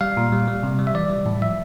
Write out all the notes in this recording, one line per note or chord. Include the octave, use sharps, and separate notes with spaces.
G3 F5
A#2
G3
G3
C3
G3
E5
E3 D5
G3
A2
F3 E5